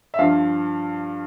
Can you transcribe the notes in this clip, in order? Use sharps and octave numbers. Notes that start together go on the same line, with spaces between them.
E5
G2 F3 F5